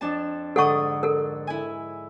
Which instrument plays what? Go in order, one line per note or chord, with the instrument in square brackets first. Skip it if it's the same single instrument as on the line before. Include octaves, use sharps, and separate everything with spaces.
[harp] F2 D4 A5
[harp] G#2 D3 D#6 [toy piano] A4 F#5 C#6
[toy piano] A4 A#4
[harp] E4 G#5